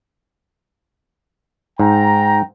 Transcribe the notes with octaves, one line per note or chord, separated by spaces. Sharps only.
G#2 G5 A#5